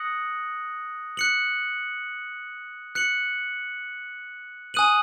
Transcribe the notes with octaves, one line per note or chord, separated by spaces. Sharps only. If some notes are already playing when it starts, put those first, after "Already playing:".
Already playing: D#6 F#6 A#6 C#7 F#7
F#6 C#7 F#7
F#6 C#7 F#7
G#5 D#6 F#6 D#7 F#7